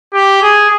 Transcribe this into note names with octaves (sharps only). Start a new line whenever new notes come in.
G4
G#4